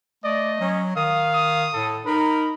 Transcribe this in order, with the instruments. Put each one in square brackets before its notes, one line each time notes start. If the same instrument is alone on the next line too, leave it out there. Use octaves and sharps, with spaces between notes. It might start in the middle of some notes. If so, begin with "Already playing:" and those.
[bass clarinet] A3 [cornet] D5 [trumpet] D#5
[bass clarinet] F#3 [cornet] C#4
[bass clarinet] D#3 [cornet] F5 [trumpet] D#6
[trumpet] D#6
[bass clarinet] A2 [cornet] A4
[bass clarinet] D#4 [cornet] A#4 [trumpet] B5